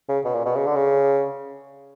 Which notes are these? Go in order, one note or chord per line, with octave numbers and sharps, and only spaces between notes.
C#3
B2
A#2
B2
C#3
D3
C#3